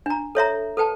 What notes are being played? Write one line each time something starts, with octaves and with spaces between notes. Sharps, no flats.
D4 A#5
A4 C#5 E5 A#5
A4 B4 G5 A5